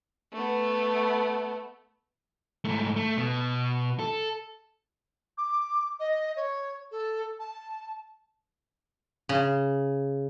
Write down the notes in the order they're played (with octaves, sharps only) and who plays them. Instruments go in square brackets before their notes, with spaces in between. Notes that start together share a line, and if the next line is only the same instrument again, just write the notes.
[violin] A3 B3
[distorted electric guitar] G#2 A3
A3
B2
A4
[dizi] D6
D#5
C#5
A4
A5
[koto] C#3